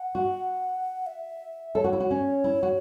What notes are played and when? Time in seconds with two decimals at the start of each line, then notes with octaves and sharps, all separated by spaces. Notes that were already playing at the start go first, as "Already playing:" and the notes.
Already playing: F#5
0.15 F#4
1.06 E5
1.75 A4 C#5
1.84 F#4
1.93 E4
2.00 F#4
2.11 C#4
2.44 E4
2.63 F#4